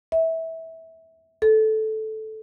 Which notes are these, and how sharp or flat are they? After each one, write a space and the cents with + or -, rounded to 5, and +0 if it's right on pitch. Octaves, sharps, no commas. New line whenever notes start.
E5 -20
A4 -10